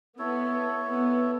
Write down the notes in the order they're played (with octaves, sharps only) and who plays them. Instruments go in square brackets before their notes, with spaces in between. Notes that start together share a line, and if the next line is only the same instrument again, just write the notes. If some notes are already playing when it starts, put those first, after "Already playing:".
[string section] B3 [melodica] E4 A4 C#5
[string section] B3